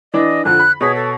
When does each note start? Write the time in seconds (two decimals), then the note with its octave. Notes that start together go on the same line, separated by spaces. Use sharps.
0.14 E3 D4 D5 D#5
0.45 F2 D3 F3 F#6
0.60 B5
0.81 B2 G#4 C#5 B6
0.95 A4